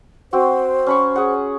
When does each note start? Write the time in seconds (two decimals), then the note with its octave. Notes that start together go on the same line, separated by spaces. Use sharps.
0.33 C4 F#4 C5
0.87 C#4 B5 C#6
1.16 G#4 F#5